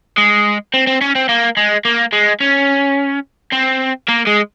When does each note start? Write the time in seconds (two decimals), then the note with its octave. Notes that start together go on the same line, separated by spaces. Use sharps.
0.18 G#3
0.74 C4
0.87 C4
1.01 C#4
1.15 C4
1.29 A#3
1.57 G#3
1.85 A#3
2.13 G#3
2.40 C#4
3.53 C4
4.08 A#3
4.27 G#3